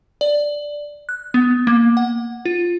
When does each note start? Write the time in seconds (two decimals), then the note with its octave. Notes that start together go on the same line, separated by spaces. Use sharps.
0.21 D5
1.09 F#6
1.34 B3
1.67 A#3
1.97 F#5
2.45 F4